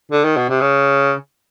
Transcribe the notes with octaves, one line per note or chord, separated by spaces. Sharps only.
D3
D#3
B2
C3
C#3